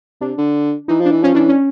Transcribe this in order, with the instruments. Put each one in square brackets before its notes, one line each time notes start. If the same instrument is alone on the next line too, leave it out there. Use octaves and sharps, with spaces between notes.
[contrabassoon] C3 [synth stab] D4
[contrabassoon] D3
[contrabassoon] E3 [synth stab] D#4
[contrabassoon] F3 [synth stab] D4
[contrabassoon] E3
[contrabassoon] F3 [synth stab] C#4
[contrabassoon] E3 [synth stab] D4
[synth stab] C#4